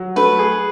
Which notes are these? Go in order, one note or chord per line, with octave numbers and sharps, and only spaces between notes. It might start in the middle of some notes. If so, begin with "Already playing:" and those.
Already playing: F#3
A3 B4
G#4